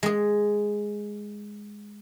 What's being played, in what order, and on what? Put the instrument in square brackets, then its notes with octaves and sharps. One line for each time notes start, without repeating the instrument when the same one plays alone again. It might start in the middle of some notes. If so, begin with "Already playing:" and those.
[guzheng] G#3 G#4